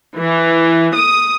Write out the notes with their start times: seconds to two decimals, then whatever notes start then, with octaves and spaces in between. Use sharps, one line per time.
0.17 E3
0.94 D#6